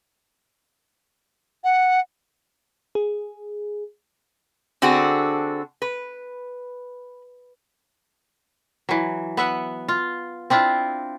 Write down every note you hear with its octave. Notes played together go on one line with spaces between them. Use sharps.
F#5
G#4
D3 C4 D4 F#4 G#4
B4
E3 F#3
B3 E5 F#5
F4
C4 D4 E4 F4